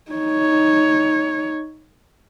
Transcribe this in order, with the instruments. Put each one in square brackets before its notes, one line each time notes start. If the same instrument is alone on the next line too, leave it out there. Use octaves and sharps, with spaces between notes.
[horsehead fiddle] D#4 C#5